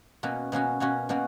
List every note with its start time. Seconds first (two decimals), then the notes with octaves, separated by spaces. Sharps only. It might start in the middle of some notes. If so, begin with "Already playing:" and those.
0.23 B2 A#3 C#4 F#4
0.52 B2 A#3 C#4 F#4
0.80 B2 A#3 C#4 F#4
1.09 B2 A#3 C#4 F#4